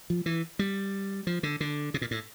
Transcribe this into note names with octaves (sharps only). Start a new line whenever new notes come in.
F3
E3
G3
F3
D3
D3
C3
A#2
A2